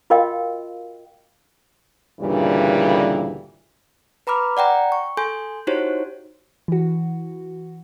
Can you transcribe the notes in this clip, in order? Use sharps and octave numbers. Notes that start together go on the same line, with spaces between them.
F4 F#4 A#4 D#5 F5 G5
D2 G2 A#2 C#3 E3 G3
B4 A#5 B5 D6 F6
D5 F#5 G5 A#5
C#6
A4 G#5 C6 G6
D#4 E4 F#4 G4 C5 C#5
E3 F#4